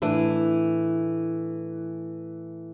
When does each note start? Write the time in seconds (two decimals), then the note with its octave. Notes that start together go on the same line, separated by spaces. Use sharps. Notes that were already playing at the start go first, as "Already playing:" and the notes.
0.02 A2 E3 D4 E4